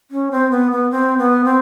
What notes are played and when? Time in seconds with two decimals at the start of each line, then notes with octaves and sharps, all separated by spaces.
0.11 C#4
0.31 C4
0.51 B3
0.72 B3
0.91 C4
1.18 B3
1.45 C4